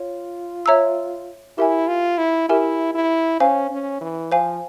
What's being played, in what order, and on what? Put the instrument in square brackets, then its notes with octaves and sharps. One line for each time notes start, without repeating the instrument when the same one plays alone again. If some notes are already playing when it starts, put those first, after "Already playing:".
Already playing: [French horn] F4 [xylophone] C#5
[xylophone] C#5 E5 A#5 E6
[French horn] E4 [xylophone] G4 A#4 E5 G#5
[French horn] F4
E4
[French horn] E4 [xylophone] G4 A#4 E5 G#5
[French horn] E4
[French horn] C#4 [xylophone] C5 F5 G#5
[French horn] C#4
E3
[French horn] F3 [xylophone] C5 F5 G#5